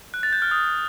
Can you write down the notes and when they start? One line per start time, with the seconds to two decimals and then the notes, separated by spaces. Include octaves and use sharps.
0.14 F#6
0.23 A6
0.33 G6
0.42 F6
0.51 D#6